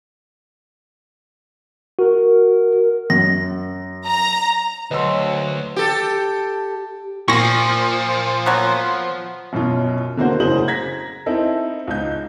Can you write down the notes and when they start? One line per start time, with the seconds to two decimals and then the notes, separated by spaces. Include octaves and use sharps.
1.99 F#4 A#4
3.10 F#2 A#6
4.06 A#5
4.91 D2 F#3 B4 C#5 D#5 C6 E6
5.76 G4 A4
7.28 A#2 F3 C#6 A#6
8.46 F#3 B3
9.53 F#2 B2 F#3 C#4 F4
10.17 D3 A#3 F#4 C5
10.40 F#1 A2 C#3 G#4 C5 F#7
10.68 A#5 G#6 A#6 B6
11.26 C4 D#4 E4 A4
11.87 C#2 D#4 G6